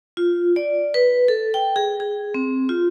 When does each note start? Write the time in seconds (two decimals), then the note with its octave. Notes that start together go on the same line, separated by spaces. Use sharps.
0.17 F4
0.56 D5
0.94 B4
1.28 A4
1.54 G5
1.76 G#4
2.00 G#4
2.34 C4
2.69 F4